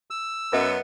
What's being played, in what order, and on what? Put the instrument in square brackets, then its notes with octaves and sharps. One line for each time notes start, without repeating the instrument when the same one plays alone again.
[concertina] E6
[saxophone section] F#2 B3 [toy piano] B4 D#5 E5